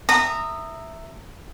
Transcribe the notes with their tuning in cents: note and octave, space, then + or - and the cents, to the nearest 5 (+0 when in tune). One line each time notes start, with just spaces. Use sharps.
E5 +0 A#5 -20 D#6 -15